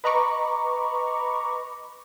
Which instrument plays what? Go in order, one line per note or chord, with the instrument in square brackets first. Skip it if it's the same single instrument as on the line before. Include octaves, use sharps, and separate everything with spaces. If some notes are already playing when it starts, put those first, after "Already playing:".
[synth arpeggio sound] B4 D#5 A#5 B5 C#6 D6